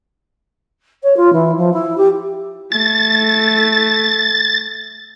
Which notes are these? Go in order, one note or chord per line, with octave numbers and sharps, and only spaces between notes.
C#5
F4
E3
F3
E4
G4
A3 A6